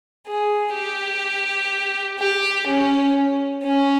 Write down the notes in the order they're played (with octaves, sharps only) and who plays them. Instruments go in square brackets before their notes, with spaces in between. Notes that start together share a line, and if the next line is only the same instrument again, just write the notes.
[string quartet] G#4
G4
G4
C#4
C#4